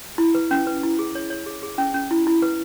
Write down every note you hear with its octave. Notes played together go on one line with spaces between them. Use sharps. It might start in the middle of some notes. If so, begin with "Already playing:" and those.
E4
B4
C#4
B4
E4
G#4
C#5
C#5
G#4
G#4
C#4
C#4
E4
E4
B4